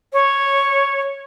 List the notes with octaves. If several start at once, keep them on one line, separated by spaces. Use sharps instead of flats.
C#5